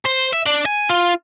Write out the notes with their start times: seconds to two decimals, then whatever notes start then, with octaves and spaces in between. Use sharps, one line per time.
0.05 C5
0.33 E5
0.46 D4
0.65 G#5
0.89 F4